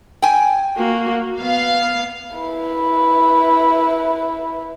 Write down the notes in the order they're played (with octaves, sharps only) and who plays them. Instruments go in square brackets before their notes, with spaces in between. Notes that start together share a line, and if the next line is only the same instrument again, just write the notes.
[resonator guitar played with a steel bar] G5 G#5
[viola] A#3 F#4
[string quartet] B3 [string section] F5
[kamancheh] E4 B4